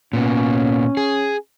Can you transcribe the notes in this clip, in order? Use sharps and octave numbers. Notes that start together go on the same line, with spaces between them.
A#2 B3 C#4
G#4